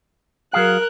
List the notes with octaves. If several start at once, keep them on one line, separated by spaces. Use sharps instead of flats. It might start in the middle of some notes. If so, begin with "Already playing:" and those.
F#3 G#4 A#4 F5 F#6